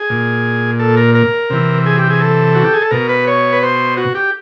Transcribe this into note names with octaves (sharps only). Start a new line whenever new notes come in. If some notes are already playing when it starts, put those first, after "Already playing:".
Already playing: G#4
A#2
A4
A#4
A#4
C3 E3
G#4
G4
G#4
A4
F#4
G4
G#4
A4
B2 A#4
B4
C#5
B4
C5
F#4
G4